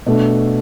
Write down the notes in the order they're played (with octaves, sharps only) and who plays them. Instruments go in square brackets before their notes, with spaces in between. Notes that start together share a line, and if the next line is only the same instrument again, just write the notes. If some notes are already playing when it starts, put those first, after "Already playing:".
[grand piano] B2 A3 D4